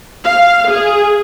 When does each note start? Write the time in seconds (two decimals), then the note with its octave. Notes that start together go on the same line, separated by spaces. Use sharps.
0.24 F5
0.68 G#4